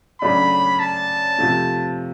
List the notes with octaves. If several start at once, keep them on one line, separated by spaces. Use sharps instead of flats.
C#3 F#3 A3 D4 B5
A5
C3 F3 A3